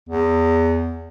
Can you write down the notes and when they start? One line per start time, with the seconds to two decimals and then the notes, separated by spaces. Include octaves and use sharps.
0.09 E2